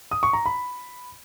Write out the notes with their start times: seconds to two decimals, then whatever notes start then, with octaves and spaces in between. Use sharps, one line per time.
0.11 D#6
0.23 C#6
0.33 A#5
0.46 B5